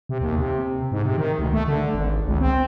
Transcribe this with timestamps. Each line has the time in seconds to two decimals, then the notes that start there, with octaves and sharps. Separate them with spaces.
0.09 C3
0.21 D#2
0.38 C3
0.92 G#2
1.05 C3
1.18 D#3
1.39 D2
1.53 A3
1.68 D3
1.95 G#1
2.27 C#2
2.41 C4